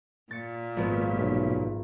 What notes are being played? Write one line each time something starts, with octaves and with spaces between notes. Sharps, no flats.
A#2 A6 C#7
G#1 F3 B3
B1